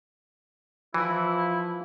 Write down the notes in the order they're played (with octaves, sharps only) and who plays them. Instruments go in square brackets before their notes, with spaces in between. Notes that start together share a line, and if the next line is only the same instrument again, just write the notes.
[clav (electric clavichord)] E3 [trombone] F3 [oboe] E4